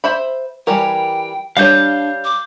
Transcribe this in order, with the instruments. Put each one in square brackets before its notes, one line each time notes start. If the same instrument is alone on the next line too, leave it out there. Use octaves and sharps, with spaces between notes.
[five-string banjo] C5 E5 B5
[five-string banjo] E3 G3 A#4 [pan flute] G5
[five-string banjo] G3 C#5 [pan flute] D4 [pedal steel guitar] F5 G6
[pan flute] D6